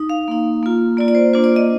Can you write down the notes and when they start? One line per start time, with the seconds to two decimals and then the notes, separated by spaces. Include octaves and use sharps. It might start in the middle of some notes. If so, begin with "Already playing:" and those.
Already playing: D#4
0.10 F5
0.28 A#3 D#4
0.63 A#3 F4
0.97 A#3 F4 D5
1.08 D5
1.15 C5
1.33 A#3 D4 F4 C5
1.44 D5
1.56 D#5